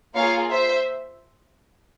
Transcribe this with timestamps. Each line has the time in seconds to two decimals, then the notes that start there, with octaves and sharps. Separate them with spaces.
0.16 A#3 F4 G#4 C#5 F5
0.51 C5 E5